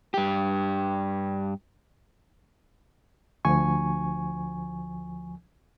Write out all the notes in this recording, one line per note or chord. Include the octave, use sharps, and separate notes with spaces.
G2 G4
D2 F3 G#5 C#6